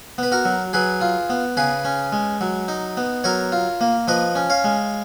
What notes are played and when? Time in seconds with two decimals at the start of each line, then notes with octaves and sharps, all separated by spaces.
0.18 B3 B4
0.32 F#4 A#4
0.45 F#3
0.73 F#3 G#4 B4
1.01 F4
1.30 B3
1.57 C#3 G#4 B4
1.85 C#4
2.13 G#3
2.41 F#3
2.68 D#4
2.97 B3
3.24 F#3 A#4 C#5
3.52 F4
3.81 A#3
4.08 F3 B4 D#5
4.35 C#4
4.50 C#5 F5
4.64 G#3